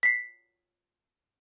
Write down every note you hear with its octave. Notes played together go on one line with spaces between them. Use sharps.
B6 C7